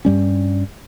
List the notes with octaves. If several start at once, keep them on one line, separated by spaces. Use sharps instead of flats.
G2 G3 C#4